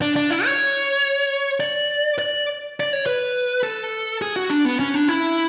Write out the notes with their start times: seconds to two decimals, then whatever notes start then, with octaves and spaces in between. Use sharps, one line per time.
0.02 D4
0.16 D4
0.30 E4
0.45 C#5
1.60 D5
2.19 D5
2.80 D5
2.93 C#5
3.06 B4
3.63 A4
4.22 G#4
4.36 F#4
4.50 D4
4.65 B3
4.80 C#4
4.94 D4
5.08 E4